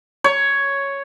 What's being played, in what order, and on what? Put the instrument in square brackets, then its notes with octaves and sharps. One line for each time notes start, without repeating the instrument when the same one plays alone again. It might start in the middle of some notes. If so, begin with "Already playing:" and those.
[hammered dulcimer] C#5